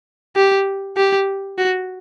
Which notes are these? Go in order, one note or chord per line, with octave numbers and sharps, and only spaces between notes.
G4
G4
F#4